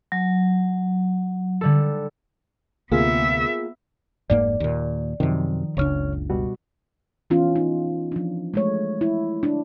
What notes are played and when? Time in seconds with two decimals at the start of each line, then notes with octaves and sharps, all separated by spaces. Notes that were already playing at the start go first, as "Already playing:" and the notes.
0.12 F#3
1.61 D3 G3 A4
2.92 D2 C3 A#3 B3 F4 G#4 E5
4.30 F1 G#2 A#3 D5
4.60 D#2 A#2
5.20 F#2 C3 D#3 F3
5.77 F#1 C#2 C#3 D4 C#5 F6
6.30 B2 G3 F#4
7.30 E3 B3 C#4 F4
7.56 D#4
8.12 F3 D4
8.54 G#3 A3 C#5
9.01 E4
9.43 D4 E4